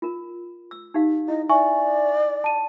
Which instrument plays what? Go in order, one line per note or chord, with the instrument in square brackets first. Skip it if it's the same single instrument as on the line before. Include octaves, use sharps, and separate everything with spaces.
[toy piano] F4 A#4
E6
D#4 G4 F5
[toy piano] E4 [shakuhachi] D#5
[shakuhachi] D5 [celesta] E5 G#5 C#6
[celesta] A5 D#7